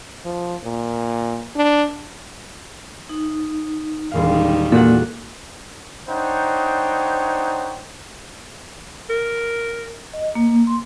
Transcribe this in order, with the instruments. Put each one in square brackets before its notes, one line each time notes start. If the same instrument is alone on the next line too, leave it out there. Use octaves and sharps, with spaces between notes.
[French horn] F3
A#2
D4
[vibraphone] D#4
[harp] E1 A#2 F5 [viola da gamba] D#3 G3
[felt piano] A#2 [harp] F#4 F#5 [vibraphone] A4
[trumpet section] D4 D#4 C5 C#5 F#5 G5
[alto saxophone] A#4
[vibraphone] D#5
A#3
C6